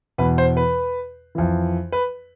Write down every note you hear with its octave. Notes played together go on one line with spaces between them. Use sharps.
E2 B2 B4
C5
B4
F2 E3
B4